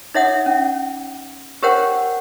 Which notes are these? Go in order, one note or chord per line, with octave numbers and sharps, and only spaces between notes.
D#4 C#5 E5 F#5 D#6
C#4
G4 A#4 C5 C#5 F#5 G5